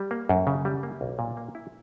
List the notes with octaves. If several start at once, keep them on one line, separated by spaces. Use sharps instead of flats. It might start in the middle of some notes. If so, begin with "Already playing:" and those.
Already playing: G3
A#3
F#2
C#3
G3
A#3
B1
A#2
A#3
E4